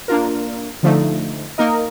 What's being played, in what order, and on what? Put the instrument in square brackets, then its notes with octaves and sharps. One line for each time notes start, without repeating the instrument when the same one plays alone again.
[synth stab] A#3 D4 F4 A#4
D3 F3 A3 D#4
A#3 D#4 A#4 D#5